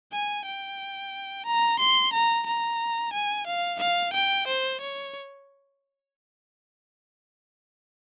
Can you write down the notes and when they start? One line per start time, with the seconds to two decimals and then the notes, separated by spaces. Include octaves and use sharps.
0.13 G#5
0.46 G5
1.46 A#5
1.79 C6
2.13 A#5
2.46 A#5
3.13 G#5
3.47 F5
3.80 F5
4.14 G5
4.48 C5
4.81 C#5